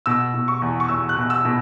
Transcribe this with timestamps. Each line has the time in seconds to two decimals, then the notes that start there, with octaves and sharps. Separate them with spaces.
0.06 B2 E6
0.34 B2
0.48 C#6
0.62 E2
0.80 C#6
0.89 E2 E6
1.09 F#6
1.17 B2
1.30 E6
1.45 B2